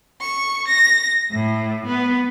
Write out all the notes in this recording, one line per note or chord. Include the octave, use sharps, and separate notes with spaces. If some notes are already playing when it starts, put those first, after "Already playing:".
C#6
A#6
A2
B3